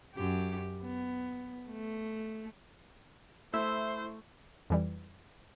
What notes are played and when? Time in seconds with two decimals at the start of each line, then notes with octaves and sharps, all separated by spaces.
0.15 F#2 G4
0.82 B3
1.70 A3
3.54 A3 E4 C5 E5
4.70 F2 E3 G3